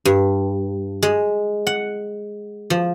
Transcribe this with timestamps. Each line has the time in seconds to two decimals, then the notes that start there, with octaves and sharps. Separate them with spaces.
0.05 G2
1.03 G#3
1.67 F#5
2.70 F3